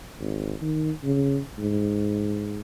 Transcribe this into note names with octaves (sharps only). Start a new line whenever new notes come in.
G#1
D#3
C#3
G#2